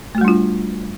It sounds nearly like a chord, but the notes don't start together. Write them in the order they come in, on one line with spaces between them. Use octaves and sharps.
A3 F#4 G3 D4 F4